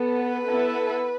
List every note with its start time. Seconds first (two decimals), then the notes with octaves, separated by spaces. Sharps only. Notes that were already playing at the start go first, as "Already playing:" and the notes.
Already playing: B3 A4
0.17 B4
0.46 B3 E4 A4